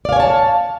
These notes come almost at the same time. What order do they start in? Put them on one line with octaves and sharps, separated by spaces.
D5 F5 G#5 C#5 A5